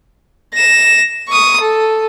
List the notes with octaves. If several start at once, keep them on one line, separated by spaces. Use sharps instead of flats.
A#6 E7
C#6 D#6
A4